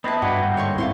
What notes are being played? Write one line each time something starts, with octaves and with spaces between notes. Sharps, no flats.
B3 C4 E4 B4 D#5 A5
G2 D4 E4 F#4 B4 G5
G#2 D3 A#3
C#5 C6 C#6
C4 E4 F4 C#5 C6